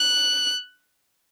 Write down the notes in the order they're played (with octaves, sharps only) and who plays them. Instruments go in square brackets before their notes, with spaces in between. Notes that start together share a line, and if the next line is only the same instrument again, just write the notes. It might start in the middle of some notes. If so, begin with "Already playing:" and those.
Already playing: [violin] F#6